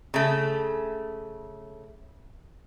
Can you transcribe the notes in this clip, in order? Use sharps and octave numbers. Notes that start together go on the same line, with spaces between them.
C#3 A3